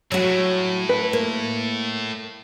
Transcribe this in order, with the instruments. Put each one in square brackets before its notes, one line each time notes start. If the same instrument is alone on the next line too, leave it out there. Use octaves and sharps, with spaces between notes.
[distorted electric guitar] A2 [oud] F#3 F#4
[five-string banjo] B4
[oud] A#3